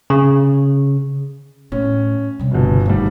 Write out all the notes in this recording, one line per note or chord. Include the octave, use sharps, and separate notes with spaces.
C#3
A2 C#4
C3 G3
G1 B2
G#1 G3 A3